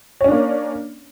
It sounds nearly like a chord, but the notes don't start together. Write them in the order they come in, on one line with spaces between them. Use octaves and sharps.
C#5 C#4 D4 A#3